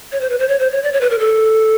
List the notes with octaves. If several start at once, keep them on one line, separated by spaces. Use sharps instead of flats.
C#5
C5
B4
C5
C#5
C5
C#5
D5
C#5
B4
A#4
A4